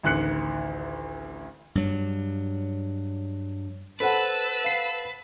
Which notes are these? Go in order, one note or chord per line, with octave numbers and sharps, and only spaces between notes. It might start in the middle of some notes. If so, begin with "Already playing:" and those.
A1 D2 D#3 F#6 C#7
G2 F#3
A4 B4 C5 F#5 A5 E6
F5 C7